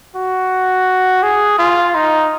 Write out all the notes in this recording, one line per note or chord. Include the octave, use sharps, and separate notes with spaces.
F#4
G#4
F4
D#4